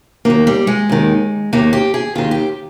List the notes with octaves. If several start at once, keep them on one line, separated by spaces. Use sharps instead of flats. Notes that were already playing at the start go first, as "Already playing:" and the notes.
D#2 D#3 A#3
G3
G#3
D#2 D#3
D#2 D#3 A#3
G4
G#4
D#2 D#3 F4
G4